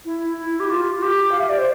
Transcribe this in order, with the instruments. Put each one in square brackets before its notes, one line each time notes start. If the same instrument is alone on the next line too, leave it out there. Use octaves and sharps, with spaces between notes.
[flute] E4
E4
G4
F4
F4
G4
F5
E5
D5
C5